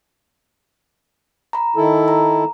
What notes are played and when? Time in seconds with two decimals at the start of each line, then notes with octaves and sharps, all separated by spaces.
1.53 A#5 B5
1.76 D#3 E4 A4
2.08 A#5